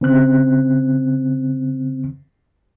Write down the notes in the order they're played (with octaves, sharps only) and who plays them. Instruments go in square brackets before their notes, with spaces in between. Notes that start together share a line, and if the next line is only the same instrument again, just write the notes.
[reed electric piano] C#3 C4 F#6